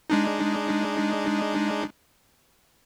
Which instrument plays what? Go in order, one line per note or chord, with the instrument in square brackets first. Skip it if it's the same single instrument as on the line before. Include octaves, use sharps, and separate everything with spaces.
[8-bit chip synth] G#3 D4 D#4